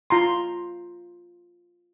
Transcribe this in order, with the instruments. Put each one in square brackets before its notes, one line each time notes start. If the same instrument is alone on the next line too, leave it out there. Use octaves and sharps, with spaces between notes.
[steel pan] F4 A#5 C6